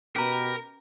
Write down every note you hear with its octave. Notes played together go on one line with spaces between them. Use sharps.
B2 C#4 G4 A#4 B4 A#5